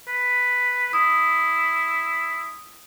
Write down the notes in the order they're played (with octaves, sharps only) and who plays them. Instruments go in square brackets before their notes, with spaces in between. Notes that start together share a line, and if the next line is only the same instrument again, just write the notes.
[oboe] B4
[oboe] E4 [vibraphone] D#6